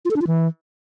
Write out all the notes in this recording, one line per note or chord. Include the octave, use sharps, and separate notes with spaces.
F4
A4
D4
F4
E3